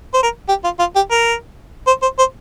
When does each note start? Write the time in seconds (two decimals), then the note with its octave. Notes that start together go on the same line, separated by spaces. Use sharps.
0.14 C5
0.23 A#4
0.49 G4
0.64 F4
0.79 F4
0.96 G4
1.11 A#4
1.87 C5
2.02 C5
2.19 C5